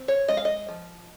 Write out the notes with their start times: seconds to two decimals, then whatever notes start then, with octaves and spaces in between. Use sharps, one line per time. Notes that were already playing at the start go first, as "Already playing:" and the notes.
Already playing: C4
0.08 C#5
0.28 G#3 D#5
0.37 F5
0.45 D#5
0.68 F3